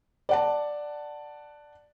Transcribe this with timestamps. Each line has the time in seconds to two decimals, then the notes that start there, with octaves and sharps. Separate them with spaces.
0.29 D5 F#5 A5